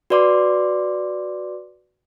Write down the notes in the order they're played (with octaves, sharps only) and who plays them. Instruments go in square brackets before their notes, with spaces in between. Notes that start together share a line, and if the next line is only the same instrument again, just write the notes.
[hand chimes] F#4 B4 D5 C6 D6